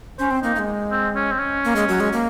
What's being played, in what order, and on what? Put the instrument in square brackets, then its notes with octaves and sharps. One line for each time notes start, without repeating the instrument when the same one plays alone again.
[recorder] C#4 [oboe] C5
[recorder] C4
[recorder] A#3 [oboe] D#4
[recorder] A#3
G#3
[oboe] C4
C#4
C4
C#4
[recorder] A#3
G#3
F#3
G#3
A#3